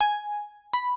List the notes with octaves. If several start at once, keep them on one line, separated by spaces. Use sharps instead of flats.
G#5
B5